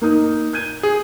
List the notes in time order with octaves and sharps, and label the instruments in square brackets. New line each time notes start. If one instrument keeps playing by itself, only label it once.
[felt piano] A#3 D#4 D#6
G6 G#6 D#7
[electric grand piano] G#4